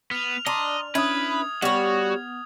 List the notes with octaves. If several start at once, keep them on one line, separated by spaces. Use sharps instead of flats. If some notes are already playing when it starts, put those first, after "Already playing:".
B3 F6 F7
D4 D5 D#5 A#5 C6
C#4 D4 E4 B4 D#6 G#6
G3 B3 F#4 C#5 F#5